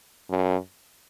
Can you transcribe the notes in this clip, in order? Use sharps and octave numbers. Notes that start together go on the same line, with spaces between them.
F#2